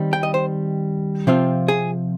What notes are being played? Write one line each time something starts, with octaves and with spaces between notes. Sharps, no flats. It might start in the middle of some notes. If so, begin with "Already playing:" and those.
Already playing: D#3 G3 C4 D#4
G5
D#5
C5
C3 F3 C4 F4
G#4